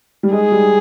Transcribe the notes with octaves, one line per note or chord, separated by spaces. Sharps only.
G3
G#3 G#4
G3